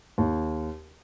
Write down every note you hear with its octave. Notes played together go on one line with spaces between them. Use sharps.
D#2